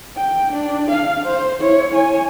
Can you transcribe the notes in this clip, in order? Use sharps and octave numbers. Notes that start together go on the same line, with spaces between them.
G5
D4
F5
C5
E4 C#5
C#5 G#5